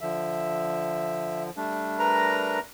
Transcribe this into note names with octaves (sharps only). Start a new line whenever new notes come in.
D3 F3 E5
G3 A3 D4
A#4 B4 A#5